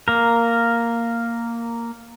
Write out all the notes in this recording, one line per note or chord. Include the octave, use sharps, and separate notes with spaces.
A#3 A#4